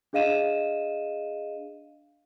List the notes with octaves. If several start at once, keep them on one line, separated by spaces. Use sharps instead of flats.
D4 G#4 D#5 F5 D#7 E7